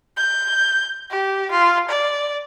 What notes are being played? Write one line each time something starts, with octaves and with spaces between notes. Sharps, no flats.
G6
G4
F4
D5